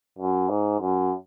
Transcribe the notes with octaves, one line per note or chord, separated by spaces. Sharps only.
F#2
G#2
F#2